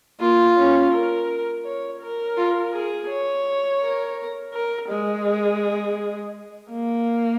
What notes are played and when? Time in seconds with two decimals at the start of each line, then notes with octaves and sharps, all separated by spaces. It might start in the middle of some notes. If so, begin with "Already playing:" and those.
0.20 A#3 F4
0.57 C#4
0.93 A#4
1.65 C#5
2.01 A#4
2.37 F4
2.73 G#4
3.09 C#5
3.81 A#4
4.54 A#4
4.89 G#3
5.26 G#4
6.70 A#3